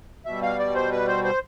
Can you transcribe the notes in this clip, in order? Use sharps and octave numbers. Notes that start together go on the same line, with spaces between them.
B2 G3 E5
F5
D5
C5
B4
C5
C5